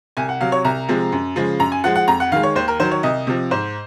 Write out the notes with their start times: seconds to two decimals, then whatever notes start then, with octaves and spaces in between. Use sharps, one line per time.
0.17 C2 G#5
0.29 F#5
0.40 C3 F#3 F5
0.52 C#5
0.65 C2 A#5
0.89 C3 F3 G#3
1.12 F#2
1.36 C#3 F3 G#3
1.59 F#2 A#5
1.72 G#5
1.84 F3 G#3 F#5
1.95 F#5
2.08 F2 A#5
2.20 F#5
2.32 D#3 F5
2.36 G#3
2.43 C#5
2.55 D#2 C5
2.68 A#4
2.79 D#3 F#3 C5
2.91 C#5
3.03 C2 D#5
3.27 C3 F3
3.51 G#2 C5